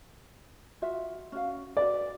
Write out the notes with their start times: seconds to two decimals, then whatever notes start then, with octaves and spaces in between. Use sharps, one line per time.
0.82 F4 F#4 E5
1.32 C#4 F#4 F5
1.77 F#4 B4 D5